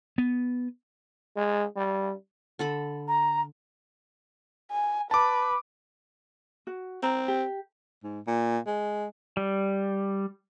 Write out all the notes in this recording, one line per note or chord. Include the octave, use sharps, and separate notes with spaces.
B3
G#3
G3
D3 A4 B5
A#5
G#5
B4 A5 D6
F#4
C4 A#5
G4
G#2
A#2
G#3
G3